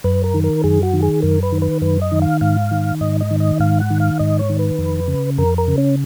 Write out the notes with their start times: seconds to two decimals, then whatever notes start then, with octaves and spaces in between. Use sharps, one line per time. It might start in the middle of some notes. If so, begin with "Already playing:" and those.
0.04 F#2 B4
0.24 A#4
0.34 D#3
0.44 A#4
0.64 F#2 G#4
0.83 F#4
0.93 D#3
1.02 G#4
1.22 F#2 A#4
1.43 B4
1.52 D#3
1.62 B4
1.82 F#2 B4
2.02 D#5
2.12 D#3
2.22 F5
2.41 G#2 F5
2.71 D#3
3.01 G#2 D#5
3.21 D#5
3.31 D#3
3.40 D#5
3.60 G#2 F5
3.80 F#5
3.90 D#3
4.00 F5
4.19 G#2 D#5
4.39 C#5
4.49 D#3
4.59 B4
4.78 F2
5.08 C#3
5.38 F2 A#4
5.58 A#4
5.68 C#3
5.78 C#4